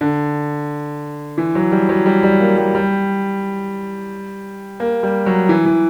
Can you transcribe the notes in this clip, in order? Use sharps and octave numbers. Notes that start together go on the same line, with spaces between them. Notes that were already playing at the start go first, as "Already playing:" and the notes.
D3
E3
F#3
G3
F#3
G3
G3
A#3
G3
G3
A#3
G3
F#3
E3
E3